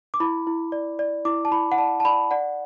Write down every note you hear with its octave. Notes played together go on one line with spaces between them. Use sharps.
D6
E4 B5
E4
D5
D5
E4 D6
A5
E4 B5
F#5
D5 A5
A5
D5 B5
D5 F#5